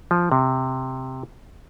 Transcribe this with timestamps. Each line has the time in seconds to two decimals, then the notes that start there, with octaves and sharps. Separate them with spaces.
0.11 F3
0.32 C3